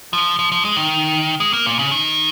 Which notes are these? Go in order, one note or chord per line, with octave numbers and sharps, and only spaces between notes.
F3
F3
F3
G#3
D#3
G#3
A#3
A#2
C#3
D#3